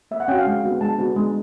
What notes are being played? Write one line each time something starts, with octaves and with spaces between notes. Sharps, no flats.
A#3 E5
F#5
C#4 F#4 G5
F5
G#3
B3 D4 F#4
G#3 A5
B3 D4 F#4
G#3